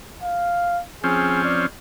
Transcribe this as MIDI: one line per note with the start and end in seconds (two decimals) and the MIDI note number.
0.23 0.81 77
1.04 1.66 53
1.04 1.66 60
1.04 1.66 61
1.04 1.42 68
1.45 1.65 74